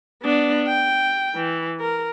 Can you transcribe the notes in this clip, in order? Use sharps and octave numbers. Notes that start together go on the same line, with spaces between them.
B3 D4
G5
E3
A#4